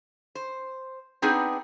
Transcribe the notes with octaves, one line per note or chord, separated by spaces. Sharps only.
C5
B3 C4 D4 D#4 G#4 B4